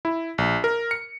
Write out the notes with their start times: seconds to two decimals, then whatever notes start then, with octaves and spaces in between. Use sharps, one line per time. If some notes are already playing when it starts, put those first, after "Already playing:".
0.05 E4
0.38 A#1
0.64 A#4
0.91 C#7